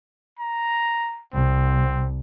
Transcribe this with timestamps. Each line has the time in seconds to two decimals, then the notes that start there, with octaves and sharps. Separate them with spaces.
0.39 A#5
1.33 C2 C4